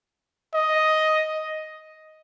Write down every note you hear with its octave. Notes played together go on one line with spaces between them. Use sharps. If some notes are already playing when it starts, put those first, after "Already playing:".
D#5